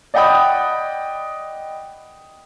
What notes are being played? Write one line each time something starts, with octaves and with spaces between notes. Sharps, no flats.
D5 D#5 F#5 G5 B5 D#6